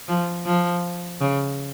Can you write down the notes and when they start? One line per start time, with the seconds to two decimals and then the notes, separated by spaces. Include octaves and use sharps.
0.08 F3
0.46 F3
1.21 C#3